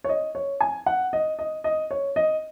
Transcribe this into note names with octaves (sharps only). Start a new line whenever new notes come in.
C#5
D#5
C#5
G#5
F#5
D#5
D#5
D#5
C#5
D#5